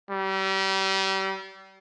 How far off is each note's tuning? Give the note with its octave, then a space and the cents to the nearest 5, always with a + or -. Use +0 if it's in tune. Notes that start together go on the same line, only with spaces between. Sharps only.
G3 -35